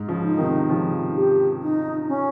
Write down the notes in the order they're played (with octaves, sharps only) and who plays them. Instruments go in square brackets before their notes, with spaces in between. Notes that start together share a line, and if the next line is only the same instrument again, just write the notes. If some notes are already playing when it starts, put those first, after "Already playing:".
Already playing: [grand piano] G#2
C#3 F3
[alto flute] D#4
[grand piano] C3 D#3
[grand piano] C#3 F3 [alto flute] D#4
[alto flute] G4
D#4
C#4